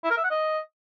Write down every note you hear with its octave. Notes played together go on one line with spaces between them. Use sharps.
E4
A#4
E5
F#5
D#5